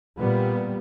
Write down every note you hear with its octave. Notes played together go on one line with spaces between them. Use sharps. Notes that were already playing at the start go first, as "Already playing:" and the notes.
A#2 G3 B3